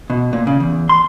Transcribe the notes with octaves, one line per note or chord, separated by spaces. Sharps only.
B2
A#2
C#3
E2
C6